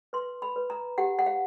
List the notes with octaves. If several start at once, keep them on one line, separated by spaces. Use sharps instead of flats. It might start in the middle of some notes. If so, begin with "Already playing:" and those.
B4 C6
B5
B4
A#5
G4 F#5
F#5
F5